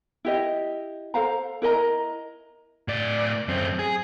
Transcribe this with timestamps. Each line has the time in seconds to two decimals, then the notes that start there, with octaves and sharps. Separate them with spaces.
0.25 E4 G4 D#5
1.14 A4 C5 F5 A#5
1.62 E4 A#4 D#5 A#5
2.88 A2 D5
3.48 F#2 C4
3.79 G#4